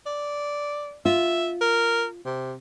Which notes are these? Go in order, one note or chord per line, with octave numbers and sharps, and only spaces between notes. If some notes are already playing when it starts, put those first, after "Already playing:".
D5
F4 E5
A#4
C3